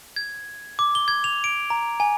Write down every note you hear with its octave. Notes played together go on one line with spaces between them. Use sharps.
G#6
D6
G7
G#6
F7
D7
A#5
G#5